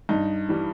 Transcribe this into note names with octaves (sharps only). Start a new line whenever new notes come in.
G2 D#4
E3 G3